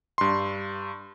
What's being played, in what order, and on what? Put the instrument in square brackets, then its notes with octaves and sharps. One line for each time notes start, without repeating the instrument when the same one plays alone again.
[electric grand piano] G2 C6